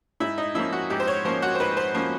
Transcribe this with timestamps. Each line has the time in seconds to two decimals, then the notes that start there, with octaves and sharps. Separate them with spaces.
0.20 G#2 E4
0.38 D#4
0.55 F3 A#3 C#4 E4
0.72 F#4
0.90 G#2 G4
1.00 C5
1.07 C#5
1.25 F3 A#3 C#4 C5
1.42 F#4
1.55 C5
1.60 G#2 B4
1.77 C5
1.94 F3 A#3 C#4 C5